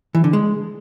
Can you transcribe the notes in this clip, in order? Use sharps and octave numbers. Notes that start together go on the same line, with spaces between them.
E3
D3
G#3